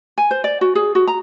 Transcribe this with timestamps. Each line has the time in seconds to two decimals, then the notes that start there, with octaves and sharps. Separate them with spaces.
0.18 G#5
0.31 C5
0.44 D5
0.61 F#4
0.75 G#4
0.95 F#4
1.07 A#5